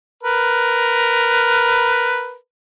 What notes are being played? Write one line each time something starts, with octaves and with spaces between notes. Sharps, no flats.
A#4 B4